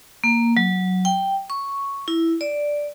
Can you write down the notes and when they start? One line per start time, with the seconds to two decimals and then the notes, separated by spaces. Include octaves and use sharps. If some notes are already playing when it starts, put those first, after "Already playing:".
0.24 A#3
0.57 F#3
1.05 G5
1.50 C#6
2.08 E4
2.41 D5